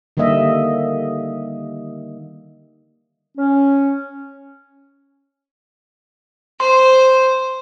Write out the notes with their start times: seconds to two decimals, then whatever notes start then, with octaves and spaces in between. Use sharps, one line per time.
0.17 D3 D#3 G3 A#3 D#5 E5
3.37 C#4
6.60 C5 C6